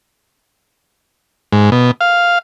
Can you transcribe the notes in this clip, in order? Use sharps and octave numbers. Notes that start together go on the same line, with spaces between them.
G#2
B2
F5